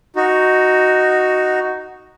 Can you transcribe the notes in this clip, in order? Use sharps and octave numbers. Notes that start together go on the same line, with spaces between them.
D#4 F#4